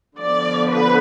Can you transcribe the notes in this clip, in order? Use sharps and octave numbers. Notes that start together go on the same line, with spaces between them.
D3 F3 B3 D5
B4